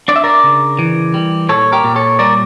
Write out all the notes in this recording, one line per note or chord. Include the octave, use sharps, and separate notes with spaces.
D4 D5
E5
A#4 D5
C#3
E3
G3
A#2 A4 C#5
G4 A#4
A#2
A4 C#5
G3 A#4 D5